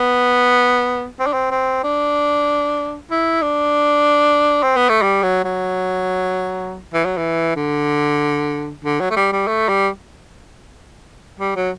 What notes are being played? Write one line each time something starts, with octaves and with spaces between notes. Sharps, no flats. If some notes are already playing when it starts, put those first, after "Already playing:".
Already playing: B3
C4
D4
C4
C4
D4
E4
D4
C4
B3
A3
G3
F#3
F#3
E3
F#3
E3
D3
D3
F#3
A3
G3
G3
A3
G3
G3
F#3